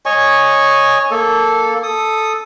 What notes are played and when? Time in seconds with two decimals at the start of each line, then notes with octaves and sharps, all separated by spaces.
0.06 C#5 D#5 G#5 C#6
1.11 A#3 A4
1.83 A4 D#6